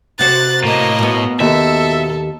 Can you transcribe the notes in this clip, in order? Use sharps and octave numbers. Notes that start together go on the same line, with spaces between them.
C3 F#4 C5 F#6 A6
A2 A#3 D#5
B2 B3
D#2 A4 E5